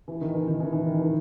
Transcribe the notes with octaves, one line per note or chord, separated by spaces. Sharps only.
E3
D#3
E3
D#3
E3
E3
D#3
E3